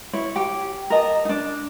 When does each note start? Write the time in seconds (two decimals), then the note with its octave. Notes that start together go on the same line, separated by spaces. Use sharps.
0.13 E4 C#5
0.36 G4
0.90 A#4 D#5 A5
1.25 D4 D#4